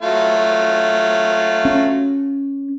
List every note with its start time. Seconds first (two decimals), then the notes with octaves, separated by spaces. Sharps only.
0.02 F#3 A3 F4
1.65 C#4